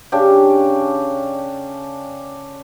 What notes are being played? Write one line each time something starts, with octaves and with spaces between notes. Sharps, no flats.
C#3 C#4 D4 G4